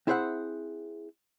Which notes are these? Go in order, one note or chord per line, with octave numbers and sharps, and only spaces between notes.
C4 E4 G#4 C5 E5 F#5